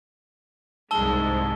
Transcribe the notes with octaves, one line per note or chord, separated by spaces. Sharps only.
C2 G#2 G#3 A5 E6 G7